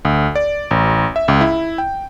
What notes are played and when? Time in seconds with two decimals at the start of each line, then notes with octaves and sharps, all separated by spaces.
0.05 D2
0.35 D5
0.71 A1
1.16 E5
1.28 C#2
1.41 E4
1.78 G5